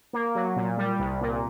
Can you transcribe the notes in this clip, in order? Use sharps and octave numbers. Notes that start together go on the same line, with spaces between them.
A#3
F#3
A#2
G3
C2
A#2